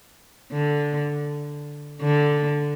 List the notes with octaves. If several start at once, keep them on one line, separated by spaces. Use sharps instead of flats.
D3
D3